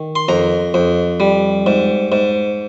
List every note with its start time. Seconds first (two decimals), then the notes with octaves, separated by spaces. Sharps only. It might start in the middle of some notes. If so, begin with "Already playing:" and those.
Already playing: D#3
0.16 C6
0.28 F2 A#5
0.74 F2
1.20 G3
1.66 G#2
2.12 G#2